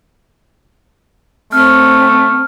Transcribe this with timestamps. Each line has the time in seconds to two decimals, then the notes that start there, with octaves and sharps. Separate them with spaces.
1.53 A3 C4 F6